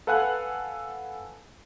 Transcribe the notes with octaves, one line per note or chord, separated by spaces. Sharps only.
A4 B4 F5 F#5 G#5 F#6